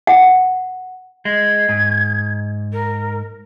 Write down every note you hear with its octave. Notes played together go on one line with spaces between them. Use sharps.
F#5
G#3 G#6
G#2
A#4